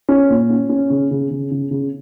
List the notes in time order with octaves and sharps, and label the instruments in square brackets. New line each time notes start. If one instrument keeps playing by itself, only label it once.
[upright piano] C#4
A#2
C#4
C#4
C#3
C#3
C#3
C#3
C#3